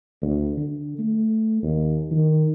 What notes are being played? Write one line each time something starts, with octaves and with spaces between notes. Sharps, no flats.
D2
D3
A3
D#2
D#3